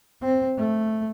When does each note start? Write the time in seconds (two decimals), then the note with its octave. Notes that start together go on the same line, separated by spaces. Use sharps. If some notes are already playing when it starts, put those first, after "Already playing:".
0.22 C4
0.58 A3